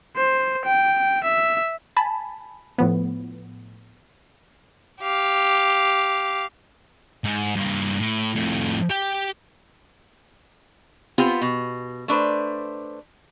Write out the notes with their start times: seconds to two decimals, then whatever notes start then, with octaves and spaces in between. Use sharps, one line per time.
0.16 C5
0.66 G5
1.24 E5
1.96 G#5 A5 B5
2.78 A2 F3 B3
5.02 G4 F5
7.24 G#2
7.56 G2 A#3
7.99 A2
8.35 F2 A2
8.90 G4 G5
11.18 B3 C4 F4 G4
11.41 B2
12.08 A3 D4 B4 C5